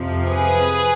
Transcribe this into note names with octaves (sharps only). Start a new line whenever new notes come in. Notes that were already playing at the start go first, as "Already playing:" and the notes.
Already playing: F2 C3 F3
G#4 B4